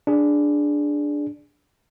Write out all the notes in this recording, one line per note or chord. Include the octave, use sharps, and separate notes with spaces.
D4 G#4